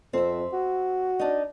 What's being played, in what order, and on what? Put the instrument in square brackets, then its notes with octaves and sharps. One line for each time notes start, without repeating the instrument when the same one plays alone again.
[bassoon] F2 [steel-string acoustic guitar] C4 E5
[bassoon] F#4
[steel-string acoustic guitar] D4 D#4